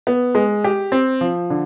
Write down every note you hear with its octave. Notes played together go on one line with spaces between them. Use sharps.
B3
G#3
G4
C4
F3
D3